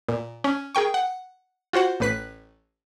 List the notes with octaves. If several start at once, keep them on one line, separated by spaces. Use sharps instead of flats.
A#2
C#4
G#4 A#4 G5 C#6
F#5
F4 F#4 C5 F#5
A1 A2 B4 F#6 B6